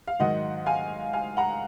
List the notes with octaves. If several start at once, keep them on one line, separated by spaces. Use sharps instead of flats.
F5
G#2 D#3 F#3 D#5 F#5
F5 G#5
F5 G#5
F#5 A#5